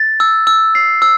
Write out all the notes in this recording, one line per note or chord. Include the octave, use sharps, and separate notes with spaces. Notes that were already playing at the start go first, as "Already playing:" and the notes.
Already playing: A6
E6
E6
C7
E6